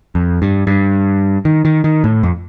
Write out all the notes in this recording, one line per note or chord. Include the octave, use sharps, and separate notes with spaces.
F2
G2
G2
D#3
D#3
D#3
A2
F2